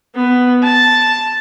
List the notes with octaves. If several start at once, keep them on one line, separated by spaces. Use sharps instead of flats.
B3
A5